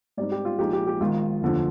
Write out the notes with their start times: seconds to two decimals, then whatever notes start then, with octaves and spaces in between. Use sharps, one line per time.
0.17 G#2 G3 C4 D#4 D5
0.32 G4
0.45 F4
0.59 A#1 A#2 F3 G#3 D#4 G4
0.73 G4
0.87 G4
1.00 G#1 G#2 D#3 F4
1.42 F1 D#2 D3 F3